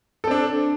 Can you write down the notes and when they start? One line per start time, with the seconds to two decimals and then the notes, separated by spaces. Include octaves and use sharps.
0.24 A4
0.27 C4
0.31 D4